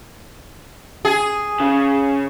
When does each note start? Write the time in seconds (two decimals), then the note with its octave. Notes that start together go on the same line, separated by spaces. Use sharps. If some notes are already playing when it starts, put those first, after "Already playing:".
1.05 G#4
1.60 C#3